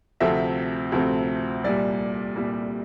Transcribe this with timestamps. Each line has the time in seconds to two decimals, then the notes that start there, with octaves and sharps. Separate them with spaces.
0.20 D2 C3 F3 A3 C4 E5
0.92 D2 C3 F3 A3 C4
1.64 C2 A#2 G3 D5
2.36 C2 A#2 G3